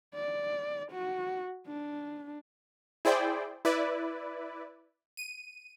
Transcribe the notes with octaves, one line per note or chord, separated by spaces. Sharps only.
D5
F#4
D4
E4 G#4 C5 D5 G5
E4 B4 D5
D#7